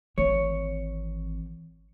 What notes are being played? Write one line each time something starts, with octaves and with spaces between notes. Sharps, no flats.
G#1 E3 C4 C#5